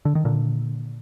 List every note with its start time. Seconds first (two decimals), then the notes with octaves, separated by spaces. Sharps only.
0.05 D3
0.15 D#3
0.25 A#2 D3